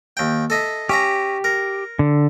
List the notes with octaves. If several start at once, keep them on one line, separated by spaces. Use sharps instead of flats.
D#2 G5
A4 D#5 E5
C#4 G4 E5 A#5
A#4
D3